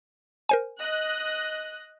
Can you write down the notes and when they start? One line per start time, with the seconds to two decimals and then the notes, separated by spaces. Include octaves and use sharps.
0.49 A#4 C5 G#5
0.80 D#5 F#6